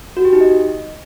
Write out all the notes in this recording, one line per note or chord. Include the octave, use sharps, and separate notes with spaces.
F#4
G4
D#4
D#5